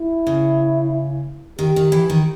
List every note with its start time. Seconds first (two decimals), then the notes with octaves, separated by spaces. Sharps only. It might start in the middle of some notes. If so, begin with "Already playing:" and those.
Already playing: E4
0.27 C#3
1.59 D#3 G4
1.76 D#3
1.92 E3
2.10 D#3